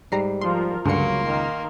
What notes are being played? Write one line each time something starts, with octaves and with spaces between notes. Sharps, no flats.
G#2 G3 A#5 C7
F3 F4 A#4 C6
C#2 G2 D3 F#3 A#3 C6 C#7
D#3 A#4